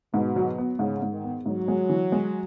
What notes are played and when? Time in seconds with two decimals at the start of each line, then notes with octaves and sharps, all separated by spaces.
0.13 G#2 B2
0.36 F#3
0.58 B3
0.79 G#2 C#3
1.02 G#2
1.13 D#3
1.24 B3
1.46 G#2 F#3
1.68 G#3
1.89 E3
2.12 G#3